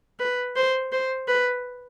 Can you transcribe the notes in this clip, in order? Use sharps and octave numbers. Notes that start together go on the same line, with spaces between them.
B4
C5
C5
B4